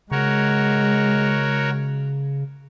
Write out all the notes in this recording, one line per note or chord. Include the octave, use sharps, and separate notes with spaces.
C#3 G#3 F#4 A#4 C#5